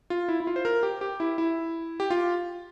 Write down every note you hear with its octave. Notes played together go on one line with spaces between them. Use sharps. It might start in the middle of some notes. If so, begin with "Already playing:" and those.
F4
E4
E4
F4
C5
A#4
G4
G4
E4
E4
G4
F4